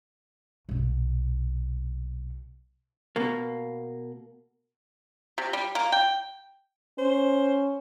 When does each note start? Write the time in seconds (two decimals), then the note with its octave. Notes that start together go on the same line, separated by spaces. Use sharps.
0.69 B1 A#2
3.16 B2 A#3
5.38 C3
5.53 G3
5.75 A#3
5.92 G5
6.98 C#4 C5